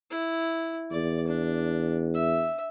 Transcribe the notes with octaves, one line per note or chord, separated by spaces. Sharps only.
E4
E2 D5
D4
E5